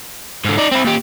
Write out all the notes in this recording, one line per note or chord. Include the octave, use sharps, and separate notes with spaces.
G#2 D3
D#4 D5
C4 E4
A#2 G4